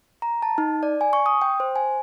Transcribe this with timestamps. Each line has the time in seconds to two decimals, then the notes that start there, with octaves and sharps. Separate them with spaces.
0.22 A#5
0.42 A5
0.58 D#4
0.83 D5
1.01 G#5
1.13 C#6
1.26 D#6
1.42 G5
1.60 C5
1.76 G#5